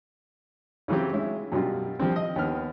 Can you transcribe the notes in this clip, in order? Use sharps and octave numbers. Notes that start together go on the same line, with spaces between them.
C#3 E3 F#3 C4 G4
G#3 C#4 E4
F#2 B2 G3 F4
F3 G3 C4
D#5
D#2 B3 F6